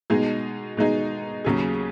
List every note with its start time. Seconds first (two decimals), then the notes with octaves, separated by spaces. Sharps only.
0.10 B2 G#3 D#4 G#4
0.77 B2 G#3 D#4 G#4
1.45 D#2 C#3 F#3 C#4 G#4